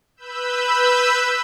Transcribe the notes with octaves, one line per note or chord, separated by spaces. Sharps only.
B4 B5 E6 G6